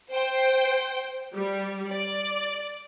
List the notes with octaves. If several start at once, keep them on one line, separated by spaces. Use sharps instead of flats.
C5 G5
G3
D5